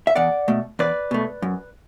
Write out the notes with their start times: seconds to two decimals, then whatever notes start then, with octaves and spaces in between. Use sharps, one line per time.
0.07 E5
0.15 E2 D5 F#5
0.48 B2 A3
0.79 E2 B4 D5
1.11 B2 A3
1.42 F#2